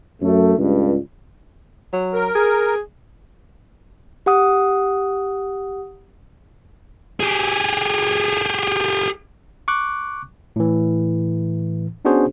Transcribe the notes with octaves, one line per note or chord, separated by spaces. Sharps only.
F#2 A3
C#2 G2
F#3
A#4
G#4
G4 F#5 D#6
G4 G#4
C#6 D6 F#6
A2 E3
B3 C#4 D4 F#4 G#4 C5